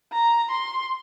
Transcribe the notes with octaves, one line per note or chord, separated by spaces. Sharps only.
A#5
C6